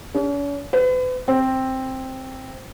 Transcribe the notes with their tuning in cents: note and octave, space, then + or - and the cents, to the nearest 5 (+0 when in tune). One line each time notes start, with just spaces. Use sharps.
C#4 +45
B4 +40
C4 +5